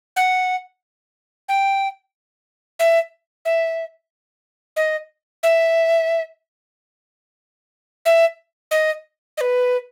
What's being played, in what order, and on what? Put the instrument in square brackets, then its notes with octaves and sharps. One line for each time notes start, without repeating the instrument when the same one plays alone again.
[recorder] F#5
G5
E5
E5
D#5
E5
E5
D#5
D#5
B4